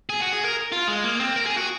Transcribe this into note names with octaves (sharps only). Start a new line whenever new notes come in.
G#4
F#4
G#4
A#4
F4
G#3
A#3
C4
A#4
G#4
F#4